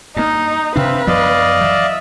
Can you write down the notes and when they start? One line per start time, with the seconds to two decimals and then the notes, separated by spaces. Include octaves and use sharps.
0.16 G2 A#3 D#4
0.76 C3 C4 D4 B4 E5 F5
1.07 F#2 F3 B3 D5 D#5 F5
1.61 E3 F#3 E5